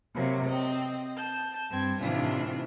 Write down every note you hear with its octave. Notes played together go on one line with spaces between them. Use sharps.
C3 F#3 A#3
C4 D#5
A5 G6
G2 C4 G#6
A2 C3 D#3 E3 D4 F4